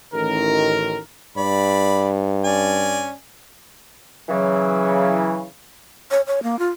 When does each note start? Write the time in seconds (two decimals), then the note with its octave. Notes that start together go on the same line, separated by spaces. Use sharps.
0.14 A1 D#3 A#4
1.37 G2 D5 B5
2.44 C#4 D5 G#5
4.29 C#3 E3 F#3
6.11 C#5
6.27 C#5
6.43 A#3
6.59 F4